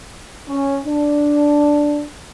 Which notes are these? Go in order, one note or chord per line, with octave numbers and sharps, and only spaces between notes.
C#4
D4